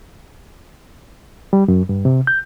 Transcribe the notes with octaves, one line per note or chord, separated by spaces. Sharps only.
G3
F#2
G2
C3
G6